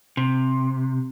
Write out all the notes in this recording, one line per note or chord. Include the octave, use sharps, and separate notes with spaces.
C3